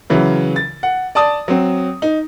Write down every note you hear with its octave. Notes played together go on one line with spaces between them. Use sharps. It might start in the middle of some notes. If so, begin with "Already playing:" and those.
C#3 E3 F#3
A6
F#5
D5 A5 D#6
F#3 C4
D#4